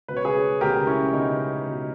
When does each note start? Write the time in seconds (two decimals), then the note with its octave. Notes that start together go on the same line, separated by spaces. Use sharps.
0.08 C#2 B2 B4
0.17 C#5
0.25 G#4 B4
0.61 C#2 B2 G4 A#4
0.87 C#4 E4
1.13 C#2 B2 D#4
1.66 C#2 B2